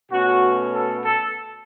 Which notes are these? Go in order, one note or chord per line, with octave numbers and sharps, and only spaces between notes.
B2 A3 C#4 F#4
A4
A4